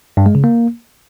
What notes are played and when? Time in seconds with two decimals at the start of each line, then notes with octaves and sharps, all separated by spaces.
0.17 G2
0.26 G#3
0.35 C#3
0.44 A#3